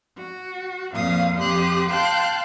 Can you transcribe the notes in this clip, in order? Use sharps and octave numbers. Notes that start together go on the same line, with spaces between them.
F#4
F2 A#2 F5 D#6
F2 G4 C6 D#6 F#6
F5 G5 A5 C6 F#6 G6